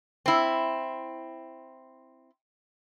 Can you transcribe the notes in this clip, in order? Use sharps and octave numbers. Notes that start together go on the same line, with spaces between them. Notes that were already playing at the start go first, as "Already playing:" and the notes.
C4 E4